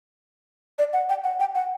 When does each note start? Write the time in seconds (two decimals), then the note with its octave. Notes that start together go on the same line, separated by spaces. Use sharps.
0.79 D5
0.93 F#5
1.09 G5
1.24 F#5
1.40 G5
1.55 F#5